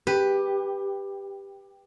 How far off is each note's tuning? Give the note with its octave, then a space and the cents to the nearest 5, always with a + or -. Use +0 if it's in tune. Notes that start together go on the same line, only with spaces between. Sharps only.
G4 +10 B4 +0